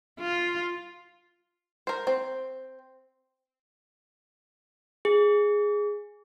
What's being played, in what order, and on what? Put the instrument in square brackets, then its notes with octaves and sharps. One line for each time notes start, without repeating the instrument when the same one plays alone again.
[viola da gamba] F4
[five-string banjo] A#4 C5
C4
[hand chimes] G#4